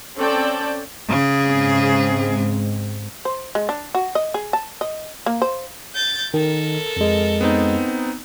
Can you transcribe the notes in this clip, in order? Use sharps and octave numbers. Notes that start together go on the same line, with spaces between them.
C4 C#4 A4 D5 G5 A5
C#3 G#4
G#2 G#3 C4
C5
G#3
D4
F#4
D#5
G#4
A5
D#5
A#3
C5
G6 A6
D#3 A4 A#4
F2 G#3
B3 C4 D#4